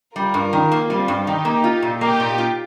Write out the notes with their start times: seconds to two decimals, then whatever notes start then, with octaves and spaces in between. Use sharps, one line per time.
0.16 G3 F4 A#4
0.34 G2
0.53 D#3
0.72 A#3
0.90 G3 C4 F4
1.08 G2
1.27 D#3 D#4 G4
1.45 A#3
1.64 F4
1.82 A#2
2.01 A#3 D#4 G4
2.20 A#2
2.38 F4